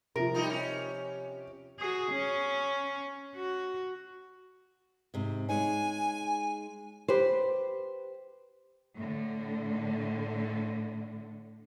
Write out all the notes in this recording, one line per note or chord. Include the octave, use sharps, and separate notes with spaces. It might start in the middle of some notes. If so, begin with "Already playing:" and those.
C3 F3 A#4
G3 D#4 F4
C#4 G4
F#4 G#4
C#4
F#4
G#2 C3
G#3 D#4 C#5 G#5
G4 B4 C5
A2 D3